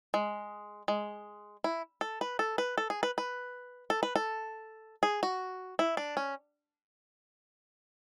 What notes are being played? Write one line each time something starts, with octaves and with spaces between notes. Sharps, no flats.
G#3
G#3
E4
A4
B4
A4
B4
A4
G#4
B4
B4
A4
B4
A4
G#4
F#4
E4
D4
C#4